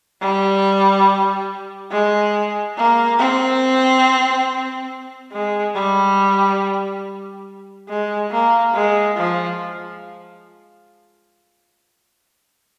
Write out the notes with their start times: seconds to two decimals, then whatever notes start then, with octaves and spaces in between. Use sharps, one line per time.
0.21 G3
1.91 G#3
2.77 A#3
3.19 C4
5.32 G#3
5.75 G3
7.89 G#3
8.31 A#3
8.74 G#3
9.16 F3